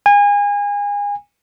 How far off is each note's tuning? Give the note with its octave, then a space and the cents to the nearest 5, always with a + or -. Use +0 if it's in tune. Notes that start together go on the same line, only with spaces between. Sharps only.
G#5 -30